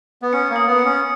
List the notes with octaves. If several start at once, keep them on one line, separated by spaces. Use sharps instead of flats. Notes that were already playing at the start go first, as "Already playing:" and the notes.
B3
C#4 C#7
A#3
D#6
B3
C#7
C#4